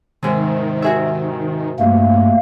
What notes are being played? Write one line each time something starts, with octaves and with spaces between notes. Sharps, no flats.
G#2 C3 D#3
F#4 G#4 E5
G2 A3 A#3